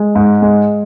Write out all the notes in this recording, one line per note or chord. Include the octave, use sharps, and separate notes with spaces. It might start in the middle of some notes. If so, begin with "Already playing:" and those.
Already playing: G#3
G#2
G#3